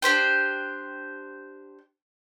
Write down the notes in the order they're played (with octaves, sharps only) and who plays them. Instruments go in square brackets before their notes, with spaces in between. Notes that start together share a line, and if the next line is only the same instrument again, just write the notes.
[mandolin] D4 G4 C5 G5